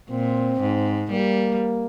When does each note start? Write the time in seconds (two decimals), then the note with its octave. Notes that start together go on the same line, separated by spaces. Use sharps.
0.10 A#2 C4
0.61 G#2
1.10 G3 A#3